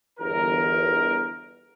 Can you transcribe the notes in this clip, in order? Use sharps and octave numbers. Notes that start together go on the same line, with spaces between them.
G1 E2 A#4